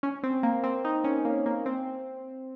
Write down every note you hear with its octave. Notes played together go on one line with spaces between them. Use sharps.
C#4
C4
A#3
C4
D#4
C#4
A#3
A#3
C4